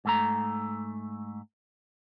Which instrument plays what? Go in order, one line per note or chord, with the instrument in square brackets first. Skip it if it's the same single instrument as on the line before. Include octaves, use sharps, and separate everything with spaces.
[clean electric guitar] G#2 A3 A#5